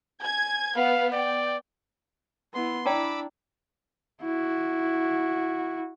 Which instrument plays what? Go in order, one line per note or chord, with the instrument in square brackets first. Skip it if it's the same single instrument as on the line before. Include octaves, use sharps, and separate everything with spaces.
[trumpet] G#5 [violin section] G#6
[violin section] B3 B4 [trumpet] F5
[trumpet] D5 [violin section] G5
[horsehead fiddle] B3 E4 [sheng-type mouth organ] C6
[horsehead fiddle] D4 E4 [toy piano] D5 G5 A#5 [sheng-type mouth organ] B5 D6 E6
[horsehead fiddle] E4 F#4